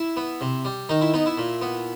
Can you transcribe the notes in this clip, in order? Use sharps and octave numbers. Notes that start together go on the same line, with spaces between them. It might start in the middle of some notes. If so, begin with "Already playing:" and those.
Already playing: E4
B3
C3
G3
D#3 D#4
E4
B3 D#4
E4
A#2
B3